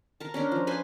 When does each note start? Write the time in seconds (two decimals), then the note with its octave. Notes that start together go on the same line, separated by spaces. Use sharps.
0.20 A#4 A5
0.34 C#4 D4 A#4
0.51 F3
0.67 B4 C5 G#5